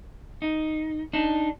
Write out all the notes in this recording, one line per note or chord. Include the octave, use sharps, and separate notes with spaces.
D#4
D4 D#4